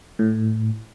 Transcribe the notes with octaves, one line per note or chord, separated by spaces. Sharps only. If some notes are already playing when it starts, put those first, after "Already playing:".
A2